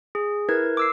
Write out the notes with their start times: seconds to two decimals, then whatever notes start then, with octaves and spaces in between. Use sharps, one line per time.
0.15 G#4
0.49 E4 A#4 B4 G#6
0.77 D6 E6 C7